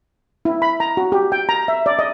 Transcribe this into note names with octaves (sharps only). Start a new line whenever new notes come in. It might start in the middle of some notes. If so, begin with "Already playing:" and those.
E4
B5
A#5
F#4
G4
G5
A#5
E5
D5
D#5